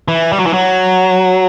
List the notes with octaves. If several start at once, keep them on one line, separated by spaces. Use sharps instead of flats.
E3
G3
F#3
E3
F#3